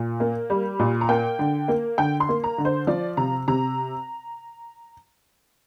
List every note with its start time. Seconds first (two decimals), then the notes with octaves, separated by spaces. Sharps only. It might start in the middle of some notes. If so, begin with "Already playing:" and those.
Already playing: A#2
0.20 A#3
0.50 G3
0.79 A#2
1.01 A#5
1.09 A#3 G5
1.39 D3
1.68 A#3
1.98 D3 G5
2.20 C6
2.29 A#3
2.44 A#5
2.58 D3
2.65 C5
2.87 F3 D5
3.17 C3 A#5
3.48 C3 A#5